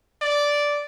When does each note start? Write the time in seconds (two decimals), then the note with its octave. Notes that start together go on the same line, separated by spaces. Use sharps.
0.22 D5